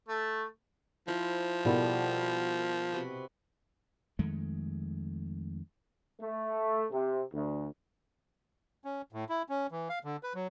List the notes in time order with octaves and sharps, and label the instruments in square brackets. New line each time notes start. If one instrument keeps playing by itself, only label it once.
[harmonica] A3
[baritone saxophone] F3 [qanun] E4 C5
[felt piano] B2 E4 A#4 [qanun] G3 A4
[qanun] C3 F#4 B4
[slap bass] F2 D#3 G#3 A3
[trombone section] A3
C3
D2
[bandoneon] C#4
A2
E4
C#4
E3
F5
D3
B4
F#3